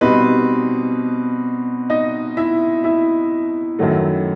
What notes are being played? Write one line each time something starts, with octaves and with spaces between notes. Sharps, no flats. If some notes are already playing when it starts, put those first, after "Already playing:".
B2 G3 C4 D#4 B4
D#4 D#5
E4 E5
E4 E5
F#2 D#3 F#3 A3